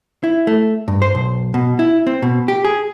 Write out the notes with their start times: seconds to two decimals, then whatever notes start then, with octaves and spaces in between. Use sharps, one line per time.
0.24 E4
0.47 A3
0.88 G2
1.02 C5
1.15 B1
1.54 B2
1.79 E4
2.07 C4
2.22 B2
2.48 G4
2.65 G#4